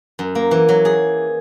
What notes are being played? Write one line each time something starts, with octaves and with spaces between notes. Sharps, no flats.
F#2
A#3
E3
F#3
G#4